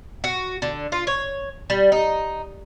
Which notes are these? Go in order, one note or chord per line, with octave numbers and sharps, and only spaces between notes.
F#4
D3
F4
C#5
G3
D#4